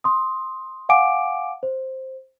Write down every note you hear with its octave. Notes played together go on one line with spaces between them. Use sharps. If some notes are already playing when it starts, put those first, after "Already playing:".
C6 D#6
F5 F#5 G#5 D6 D7
C5